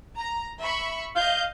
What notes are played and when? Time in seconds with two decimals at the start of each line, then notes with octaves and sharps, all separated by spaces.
0.16 A#5
0.61 E5 B5 C#6
1.16 D#5 F5 G6